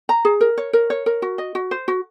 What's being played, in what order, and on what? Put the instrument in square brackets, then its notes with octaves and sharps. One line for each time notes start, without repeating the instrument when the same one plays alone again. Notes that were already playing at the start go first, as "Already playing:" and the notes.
[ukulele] A#5
G#4
A#4
C#5
A#4
C#5
A#4
F#4
D#5
F#4
C5
F#4